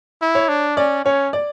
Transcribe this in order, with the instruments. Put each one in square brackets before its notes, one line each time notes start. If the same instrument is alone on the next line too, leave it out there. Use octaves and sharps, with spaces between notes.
[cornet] E4
[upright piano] C#5
[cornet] D4
[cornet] C#4 [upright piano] D5
[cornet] C#4 [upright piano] C#5
[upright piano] D5